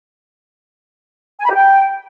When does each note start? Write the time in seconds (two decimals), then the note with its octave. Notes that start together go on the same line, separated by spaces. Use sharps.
1.39 G#5
1.45 B5
1.50 G4
1.55 G5